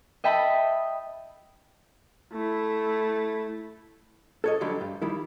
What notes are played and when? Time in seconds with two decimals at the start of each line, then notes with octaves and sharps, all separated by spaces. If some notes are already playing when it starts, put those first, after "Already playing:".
0.24 D#5 E5 G5 A5 B5
2.33 A3 E4
4.44 A4 C#5 D#5
4.61 D3 F#3 G3 D4
4.81 G2
5.02 D#3 G3 E4